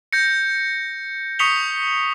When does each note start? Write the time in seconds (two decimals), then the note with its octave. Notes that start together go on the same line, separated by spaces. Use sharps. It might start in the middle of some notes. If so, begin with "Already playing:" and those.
0.13 G6 A#6 C#7
1.39 C#6 D#6 B6 C#7 F7 G7